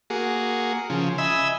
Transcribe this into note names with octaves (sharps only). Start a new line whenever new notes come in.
A#3 F#4 G#4
C#3 F3
D#5 E5 G#5 B5 E6